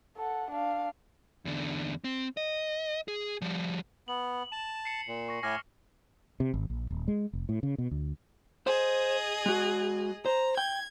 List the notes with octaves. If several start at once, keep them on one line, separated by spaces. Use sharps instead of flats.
A4 F#5
D4 F5
E2 D3
C4
D#5
G#4
F3 G3
B3 F#7
A5 E7
C7 C#7 E7
A#2
C#6 A#6
A2 G#5 D6 F6 A#6
C3
G#1
A#1
D#1
G#3
F1
A2
C#3
B2
D2
G#4 C5 D#5
G#3 F#4
C5 A#5
G5 G#6